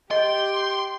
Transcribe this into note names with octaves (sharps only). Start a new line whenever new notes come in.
G4 D#5 G5 C6